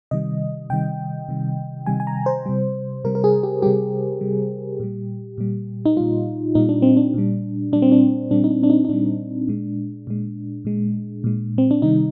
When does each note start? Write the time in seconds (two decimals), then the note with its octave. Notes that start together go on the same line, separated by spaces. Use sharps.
0.11 C3 D#3 G3 D#5
0.70 C3 D#3 G3 G5
1.28 C3 D#3 G3
1.86 C3 D#3 G3 G#5
2.00 G#5
2.07 A#5
2.26 C5
2.46 C3 G3
3.05 C3 G3 A#4
3.15 A#4
3.24 G#4
3.43 G4
3.62 C3 G3 G4
4.21 C3 G3
4.80 A#2 G3
5.38 A#2 G3
5.86 D#4
5.96 A#2 G3 F4
6.55 A#2 G3 D#4
6.69 D4
6.82 C4
6.97 D4
7.14 A#2 G3
7.72 A#2 G3 D4
7.82 C4
7.92 D4
8.31 A#2 G3 D4
8.44 D#4
8.51 D4
8.63 D4
8.70 D#4
8.85 D#4
8.89 A#2 G3 D4
9.48 A#2 G#3
10.07 A#2 G#3
10.65 A#2 G#3
11.24 A#2 G#3
11.58 C4
11.71 D4
11.82 C3 D#3 G3 D#4